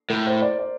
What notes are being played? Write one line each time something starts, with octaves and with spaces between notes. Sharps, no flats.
A2 A#4
C5
D5
D5